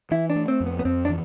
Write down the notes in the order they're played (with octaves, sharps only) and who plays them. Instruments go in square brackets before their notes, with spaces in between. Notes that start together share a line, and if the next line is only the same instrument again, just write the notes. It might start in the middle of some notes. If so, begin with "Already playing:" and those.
[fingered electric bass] E3 [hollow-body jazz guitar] E4
[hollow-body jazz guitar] D4
[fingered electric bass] A3
[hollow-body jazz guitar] C4
[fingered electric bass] F2
[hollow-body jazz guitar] B3
B3
[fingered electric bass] F2 [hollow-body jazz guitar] C4
[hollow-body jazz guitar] D4
[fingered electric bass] E3